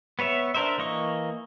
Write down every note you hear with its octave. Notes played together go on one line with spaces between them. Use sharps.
B3 B4 C#5 E5
D4 A#4 C5 E5
E3 A#3 D#5 C#6